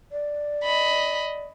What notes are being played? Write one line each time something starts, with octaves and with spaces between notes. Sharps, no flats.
D5
D#5 B5